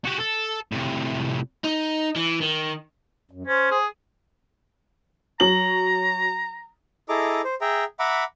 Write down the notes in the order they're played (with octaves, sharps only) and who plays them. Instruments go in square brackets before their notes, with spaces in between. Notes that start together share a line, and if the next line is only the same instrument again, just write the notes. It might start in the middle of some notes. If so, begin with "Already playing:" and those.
[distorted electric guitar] F#4 G4
A4
A2 C3
[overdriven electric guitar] D#4
E3
D#3
[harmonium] F#2
[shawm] C#4 [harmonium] C5
[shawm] G#4
[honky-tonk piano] F#3 F#7 [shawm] A#5
[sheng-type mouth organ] E4 G#4 A4 D#5 A#5 D6
C5
G#4 E5 G5 A#5
E5 F#5 A#5 B5 D6